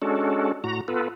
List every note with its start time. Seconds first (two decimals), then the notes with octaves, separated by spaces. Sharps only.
0.02 G#3 C#4 D4 F#4 A4
0.64 A2 F#4 A#5
0.88 B3 F4 A4 B4